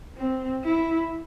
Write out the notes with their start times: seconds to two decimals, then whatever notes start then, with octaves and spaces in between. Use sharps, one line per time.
0.17 C4
0.64 E4